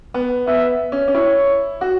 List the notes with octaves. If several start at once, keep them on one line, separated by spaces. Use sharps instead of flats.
B3
B3 E5
C#4
C#4
E4 C#5
F#4